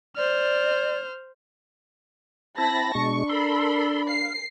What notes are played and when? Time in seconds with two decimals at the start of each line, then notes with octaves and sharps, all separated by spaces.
0.16 C5 D5 F6
2.58 C4 E4 A5 B5 A#6
2.95 B2 G#3 D4 C#6
3.29 A4 A#4 B5 C6
4.09 F5 C7